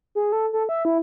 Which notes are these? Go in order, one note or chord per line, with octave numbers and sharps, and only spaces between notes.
G#4
A4
A4
E5
E4